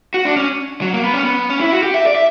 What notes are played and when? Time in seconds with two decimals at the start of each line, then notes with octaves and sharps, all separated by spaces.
0.14 F#4
0.25 D4
0.36 C#4
0.81 F#3
0.93 A#3
1.04 B3
1.14 C#4
1.23 B3
1.49 C#4
1.60 E4
1.72 F#4
1.83 G4
1.94 E5
2.06 D5
2.15 E5